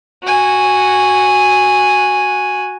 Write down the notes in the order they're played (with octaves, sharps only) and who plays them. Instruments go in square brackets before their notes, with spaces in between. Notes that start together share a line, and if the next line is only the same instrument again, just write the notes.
[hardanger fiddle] F#4 G#5